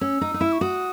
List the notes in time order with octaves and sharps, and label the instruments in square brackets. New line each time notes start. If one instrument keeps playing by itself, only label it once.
[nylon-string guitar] C#4 [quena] E6
[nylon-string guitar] D#4
D#4
E4
[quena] C#6
[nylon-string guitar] F#4 [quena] D#6